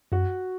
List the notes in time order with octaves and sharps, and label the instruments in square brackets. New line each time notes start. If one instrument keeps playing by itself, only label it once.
[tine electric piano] F#2 [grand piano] F#4